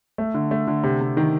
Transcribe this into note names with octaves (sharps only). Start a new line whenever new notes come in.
A3
D3
A3
D3
C3
C3
D#3